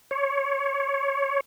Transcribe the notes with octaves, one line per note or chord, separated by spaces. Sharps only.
C#5